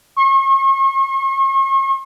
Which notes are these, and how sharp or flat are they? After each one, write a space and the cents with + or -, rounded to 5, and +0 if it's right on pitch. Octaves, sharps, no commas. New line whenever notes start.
C#6 -40